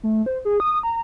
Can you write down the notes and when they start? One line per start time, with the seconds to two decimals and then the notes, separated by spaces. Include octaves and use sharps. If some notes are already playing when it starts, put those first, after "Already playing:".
0.03 A3
0.26 C5
0.45 G#4
0.60 D#6
0.83 A#5